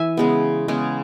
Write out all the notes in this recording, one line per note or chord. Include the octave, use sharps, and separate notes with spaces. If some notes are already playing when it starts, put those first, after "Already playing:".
Already playing: E3 E5 G#5
C#3 G#3 B3
C#3 G#3 B3